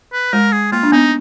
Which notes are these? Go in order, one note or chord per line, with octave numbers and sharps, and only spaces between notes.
B4
G#3 A#4
G#4
A#3 F4
D4
B3 D#4